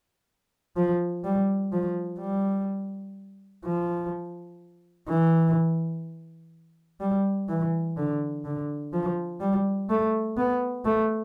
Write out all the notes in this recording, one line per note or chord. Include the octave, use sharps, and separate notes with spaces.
F3
G3
F3
G3
F3
E3
G3
E3
D3
D3
F3
G3
A3
B3
A3